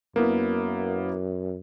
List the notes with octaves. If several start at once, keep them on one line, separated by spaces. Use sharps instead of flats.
F#2 A#3 B3 E4